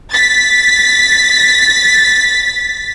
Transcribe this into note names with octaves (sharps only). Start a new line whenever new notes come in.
A6 B6